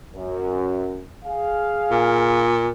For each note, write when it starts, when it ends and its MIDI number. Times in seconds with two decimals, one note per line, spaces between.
0.14 1.04 42
1.25 2.46 68
1.25 2.46 77
1.91 2.70 46